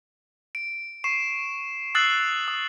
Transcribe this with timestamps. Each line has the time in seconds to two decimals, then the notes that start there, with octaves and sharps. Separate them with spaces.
0.55 D7
1.04 C#6 C7 E7
1.95 D#6 E6 F#6 A6 C7 F#7
2.48 D#6